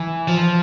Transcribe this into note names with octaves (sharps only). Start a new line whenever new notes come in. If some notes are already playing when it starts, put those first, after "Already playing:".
Already playing: E3
F3